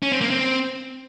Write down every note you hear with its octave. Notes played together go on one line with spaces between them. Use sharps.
C#4
C4
A#3
C4